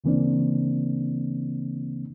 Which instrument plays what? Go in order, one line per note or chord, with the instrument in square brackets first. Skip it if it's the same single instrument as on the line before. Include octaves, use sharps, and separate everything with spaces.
[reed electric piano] D2 C#3 E3 A#3 C4 D4